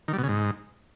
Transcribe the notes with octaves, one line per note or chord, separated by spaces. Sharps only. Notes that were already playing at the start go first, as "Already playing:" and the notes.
D#3
G3
B2
C#3
G#2